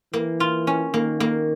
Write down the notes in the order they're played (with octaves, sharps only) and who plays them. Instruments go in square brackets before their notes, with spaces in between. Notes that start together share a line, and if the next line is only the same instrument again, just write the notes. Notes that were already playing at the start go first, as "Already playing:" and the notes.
[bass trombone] E3 [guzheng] A#3
[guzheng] F4
C#4
[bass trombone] D#3 [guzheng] A#3
[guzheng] A#3